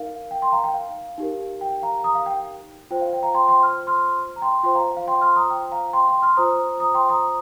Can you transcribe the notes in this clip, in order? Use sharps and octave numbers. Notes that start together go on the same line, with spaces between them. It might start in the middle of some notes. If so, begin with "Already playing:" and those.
Already playing: D#4 A#4 F5
G5
G5 C6
F5 A#5
G5
F5
D#4 G4 A#4
G5
F5 A#5
A#5 D#6
F5
G5
F4 C5 G5
F5
G5
F5 A#5
G5 C6
G5 C6
F6
C6 F6
A#5
G5 C6
F4 C5 G5 C6
F5 A#5
F5
G5 C6
C6 F6
A#5 D#6
G5
F5 A#5
G5 C6
G5 C6
C6 F6
F4 C5 A#5 D#6
A#5 D#6
G5 C6
A#5 D#6